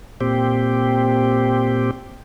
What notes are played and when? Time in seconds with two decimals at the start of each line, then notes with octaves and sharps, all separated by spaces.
0.21 A#2 C4 G4